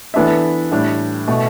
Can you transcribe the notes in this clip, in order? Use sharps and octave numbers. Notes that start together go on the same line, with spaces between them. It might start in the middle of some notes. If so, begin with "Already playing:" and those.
E3 B3 D4 A4 E5
A2 G3 D4
B2 A3